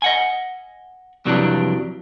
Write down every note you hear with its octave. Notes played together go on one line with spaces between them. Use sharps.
D#5 F#5 G#5
F2 C3 E3 F#3 G3 D4